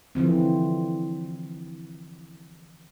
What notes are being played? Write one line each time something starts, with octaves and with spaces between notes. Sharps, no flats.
D3 E3 F3 C4